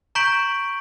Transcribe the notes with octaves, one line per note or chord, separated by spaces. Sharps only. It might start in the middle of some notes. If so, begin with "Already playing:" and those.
A#5 C#6 G6 B6 D7 F#7